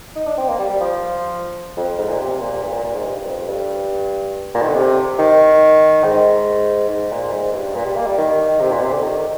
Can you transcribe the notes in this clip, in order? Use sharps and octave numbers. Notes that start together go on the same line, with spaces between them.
D#4
D4
C4
A#3
G3
G3
F3
F2
G#2
A#2
C3
A#2
G2
A#2
A#2
G#2
G2
F2
G2
A#2
D#3
D3
C3
D#3
G#2
G#2
A#2
G#2
G2
A#2
G3
A#3
G3
D#3
C3
A#2
C3
D3
D#3